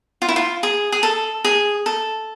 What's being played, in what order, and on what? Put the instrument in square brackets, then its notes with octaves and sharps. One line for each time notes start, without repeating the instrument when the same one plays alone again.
[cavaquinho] F4
E4
F4
G#4
G#4
A4
G#4
A4